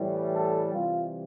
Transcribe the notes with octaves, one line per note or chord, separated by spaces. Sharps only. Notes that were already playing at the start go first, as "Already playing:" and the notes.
Already playing: A2 E3 G3
A4
C3 E3 G3 F4